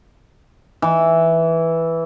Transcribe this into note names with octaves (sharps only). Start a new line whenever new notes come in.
E3